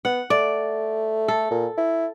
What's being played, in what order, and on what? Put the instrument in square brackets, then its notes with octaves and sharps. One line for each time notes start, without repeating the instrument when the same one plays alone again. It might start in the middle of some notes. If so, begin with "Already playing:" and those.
[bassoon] B3 [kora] F#5
[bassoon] A3 [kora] D5
[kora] A4
[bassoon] A#2
E4